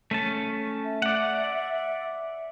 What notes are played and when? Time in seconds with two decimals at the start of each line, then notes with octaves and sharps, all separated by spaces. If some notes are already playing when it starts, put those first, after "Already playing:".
0.11 A3 C#4 A5
0.84 E5
1.02 D5 F#5